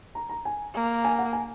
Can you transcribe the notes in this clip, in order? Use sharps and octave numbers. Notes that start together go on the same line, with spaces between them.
A#5
A#5
G#5
A#3
G#5
F#5
G#5